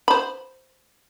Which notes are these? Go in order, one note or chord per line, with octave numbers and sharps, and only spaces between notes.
C5 B5